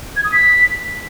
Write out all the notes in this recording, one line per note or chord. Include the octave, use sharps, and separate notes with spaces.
G#6
D#6
B6